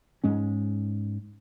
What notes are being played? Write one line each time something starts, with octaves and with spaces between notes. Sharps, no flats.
G#2 G#3 C#4